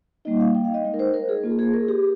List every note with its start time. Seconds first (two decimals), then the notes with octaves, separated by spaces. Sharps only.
0.25 G3 A#3 D#4 D#5
0.40 F5
0.55 G5
0.65 F5
0.74 D#5
0.85 G#3 D#4
0.94 A#4
0.99 C5
1.14 A#4
1.29 G#4
1.43 A#3 F4
1.59 G#4
1.74 A#4
1.88 G4